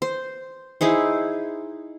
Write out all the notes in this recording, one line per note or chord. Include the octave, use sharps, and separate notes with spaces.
C5
D#4 E4 G#4 C5